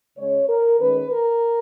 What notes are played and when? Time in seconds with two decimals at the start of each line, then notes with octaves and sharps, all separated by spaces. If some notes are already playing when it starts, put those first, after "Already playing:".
0.18 C#3 G#3 C#4 C#5
0.49 A#4
0.80 D#3 G#3 C#4 B4
1.11 A#4